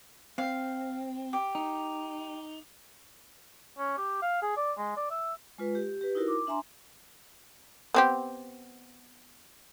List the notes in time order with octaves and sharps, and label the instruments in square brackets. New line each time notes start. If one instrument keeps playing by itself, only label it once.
[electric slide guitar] C4 [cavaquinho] F5
[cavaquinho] G4
[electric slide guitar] D#4
[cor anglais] C#4
G4
F5
G#4
D5
G#3
D5
E5
[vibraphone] G#3 F4 B4
G4
G4 B4
D#4 E4 F#4 A#4
D6
D4 E5 G#5 A#5 C6
[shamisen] B3 C4 G4